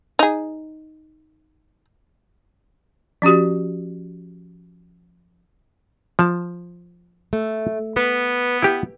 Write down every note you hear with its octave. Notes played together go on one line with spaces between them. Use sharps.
D#4 G#4
F3 C#4 F#4 G4
F3 A5
A3
B3 B4
E4 G4